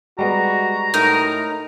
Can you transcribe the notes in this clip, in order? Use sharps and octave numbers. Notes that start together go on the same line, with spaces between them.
G3 G#3 B3 F#4 A#5
A2 D#4 A#4